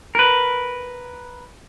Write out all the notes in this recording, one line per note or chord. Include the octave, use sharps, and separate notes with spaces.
A#4 B4